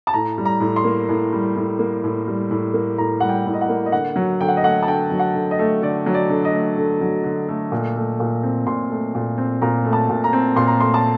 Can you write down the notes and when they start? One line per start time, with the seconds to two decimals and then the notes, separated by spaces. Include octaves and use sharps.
0.07 A5
0.13 A2 A#5
0.38 G3
0.45 A#5
0.60 A2
0.76 C6
0.84 A#3
1.09 A2
1.33 G3
1.56 A2
1.79 A#3
2.04 A2
2.27 G3
2.51 A2
2.74 A#3
2.98 A2 A#5
3.20 G3 F#5
3.29 G5
3.46 A2
3.54 D#5
3.61 F#5
3.69 A#3
3.86 D#5
3.92 D3 F#5
4.16 F#3
4.40 D3 G5
4.48 F#5
4.57 D#5
4.63 A3 F#5
4.82 A5
4.87 D3 G5
5.11 F#3
5.19 F#5
5.35 D3
5.51 D#5
5.59 A3
5.82 D3 D5
6.06 F#3
6.14 D5
6.30 D3
6.45 D#5
6.53 A3
6.78 D3
7.01 F#3
7.24 D3
7.49 A3
7.72 A#2
7.96 A3
8.20 A#2
8.43 C4
8.67 A#2 C6
8.90 A3
9.15 A#2
9.38 C4
9.62 A#2 A#5
9.85 A3
9.93 A5
10.09 A#2
10.24 A#5
10.33 C4
10.56 A#2 C6
10.68 A#5
10.80 A3 C6
10.94 A5